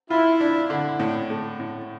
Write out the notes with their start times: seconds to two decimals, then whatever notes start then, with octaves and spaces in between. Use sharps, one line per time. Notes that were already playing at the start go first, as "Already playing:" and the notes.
0.10 E4 F4
0.41 D4
0.70 D3
1.00 A2
1.30 A3
1.60 A2